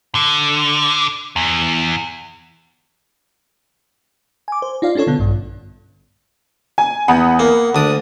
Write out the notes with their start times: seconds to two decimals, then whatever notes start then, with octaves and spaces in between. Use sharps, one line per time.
0.15 D3
1.36 E2
4.48 G#5 D6
4.62 C5
4.82 D#4 F4 D5 F5
4.95 C#4 D4 F4 A4 C#5
5.07 B2 D3 B3
5.19 A#1 G2
6.78 G#5
7.08 E2 F#5 B5 D#6
7.39 A#3
7.75 D2 D4 D#6